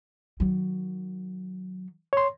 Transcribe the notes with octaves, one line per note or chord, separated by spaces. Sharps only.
D#3 F#3
C#5 C6